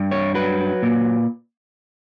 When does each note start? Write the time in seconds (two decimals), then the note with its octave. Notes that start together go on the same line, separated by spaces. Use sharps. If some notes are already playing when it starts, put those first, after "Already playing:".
Already playing: G2
0.11 C#5
0.34 F#3 B4
0.83 A#2